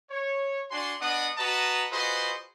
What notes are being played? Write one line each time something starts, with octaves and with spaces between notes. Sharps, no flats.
C#5
D4 F#4 G#5 C6
B3 D4 D#5 F#5 D#6
F#4 B4 D#5 A5 A#5
F4 F#4 G#4 B4 C5 D#5